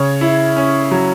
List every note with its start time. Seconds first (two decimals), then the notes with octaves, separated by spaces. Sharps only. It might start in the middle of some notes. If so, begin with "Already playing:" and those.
Already playing: C#3 C#5
0.21 E4
0.56 C#4
0.91 F#3